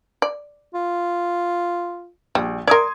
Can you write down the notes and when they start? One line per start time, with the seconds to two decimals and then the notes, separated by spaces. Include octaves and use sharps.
0.22 D5
0.75 F4
2.35 A#1 G3
2.67 A#4 D5 C6 D#6 G#6